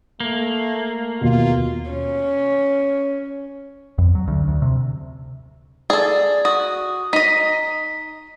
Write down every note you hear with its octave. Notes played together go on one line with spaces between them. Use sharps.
A3 A#3
D#2 B2 F4
C#4
F2
F#3
D2
D2
C3
G#4 A4 D5
F#4 D#6
D#4 D#5 B6